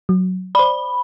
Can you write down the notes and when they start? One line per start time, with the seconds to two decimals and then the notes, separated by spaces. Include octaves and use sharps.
0.09 F#3
0.55 C5 D5 B5